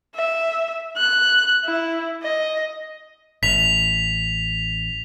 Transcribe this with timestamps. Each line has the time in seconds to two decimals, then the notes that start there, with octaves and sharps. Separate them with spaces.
0.15 E5
0.97 F#6
1.65 E4
2.23 D#5
3.43 A1 B6 F7